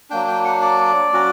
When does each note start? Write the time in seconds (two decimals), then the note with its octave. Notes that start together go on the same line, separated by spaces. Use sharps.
0.10 F#3 A#3 D4 G5
0.27 G5
0.45 F#5
0.61 D5
1.13 F#3 C#4 F#4